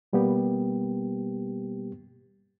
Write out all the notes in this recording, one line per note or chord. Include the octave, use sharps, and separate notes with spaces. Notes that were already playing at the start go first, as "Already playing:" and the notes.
B2 G3 A#3 B3 G4